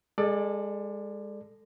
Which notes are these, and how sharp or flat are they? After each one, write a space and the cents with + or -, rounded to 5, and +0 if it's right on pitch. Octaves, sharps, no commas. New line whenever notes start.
G#3 -20 A4 +0 D5 +20